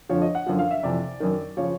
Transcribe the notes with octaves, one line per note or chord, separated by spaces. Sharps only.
F2 D3 F3 C#5
D#5
F#5
F#2 D3 F3
F5
E5
F2 C3 E3 D5
F#2 D#3
C#3 F3 C#5